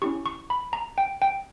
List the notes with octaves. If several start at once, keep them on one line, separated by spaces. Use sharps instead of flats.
C#4 E4 G4 C#6
C#6
B5
A#5
G5
G5